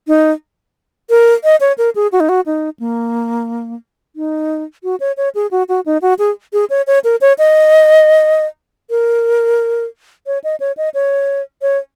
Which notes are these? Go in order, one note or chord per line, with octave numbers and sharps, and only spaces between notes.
D#4
A#4
D#5
C#5
A#4
G#4
F#4
D#4
F#4
D#4
A#3
D#4
F#4
C#5
C#5
G#4
F#4
F#4
D#4
F#4
G#4
G#4
C#5
C#5
A#4
C#5
D#5
A#4
C#5
D#5
C#5
D#5
C#5
C#5